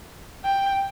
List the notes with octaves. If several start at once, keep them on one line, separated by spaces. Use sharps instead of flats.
G5